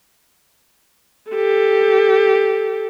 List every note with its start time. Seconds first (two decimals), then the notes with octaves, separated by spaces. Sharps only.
1.31 G4 A4